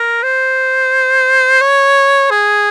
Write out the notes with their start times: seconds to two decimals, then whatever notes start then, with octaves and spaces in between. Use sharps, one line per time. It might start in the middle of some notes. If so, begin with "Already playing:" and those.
Already playing: A#4
0.23 C5
1.62 C#5
2.31 G#4